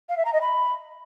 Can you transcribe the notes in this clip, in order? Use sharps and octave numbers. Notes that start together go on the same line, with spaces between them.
F5
E5
A#5
D#5
B5